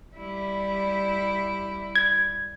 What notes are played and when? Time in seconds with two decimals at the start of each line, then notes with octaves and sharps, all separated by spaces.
0.17 G3 E4
1.95 G#6